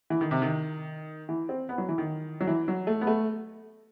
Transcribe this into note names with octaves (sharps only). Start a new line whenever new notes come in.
E3
D#3
C3
D#3
E3
C4
B3
F#3
E3
D#3
F#3
E3
F#3
A3
B3
A3